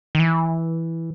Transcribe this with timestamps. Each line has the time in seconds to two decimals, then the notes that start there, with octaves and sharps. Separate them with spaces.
0.15 D#3
0.20 E3